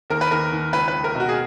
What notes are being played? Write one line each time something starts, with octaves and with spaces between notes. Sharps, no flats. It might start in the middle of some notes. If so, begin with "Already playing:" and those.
D#2 A#4
B4
D#2 A#4
D#2
C#2 B4
B4
C#2
A#4
B2 F#4
G#4